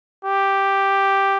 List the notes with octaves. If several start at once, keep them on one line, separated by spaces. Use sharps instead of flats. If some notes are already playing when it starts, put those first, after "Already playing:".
G4